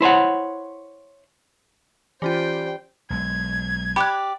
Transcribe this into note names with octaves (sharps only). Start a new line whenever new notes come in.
E4 C5 C#5 F#5
E3 G3 C#4 F4 C5 G5
B1 G#3 G#6
G4 D5 B5 F#6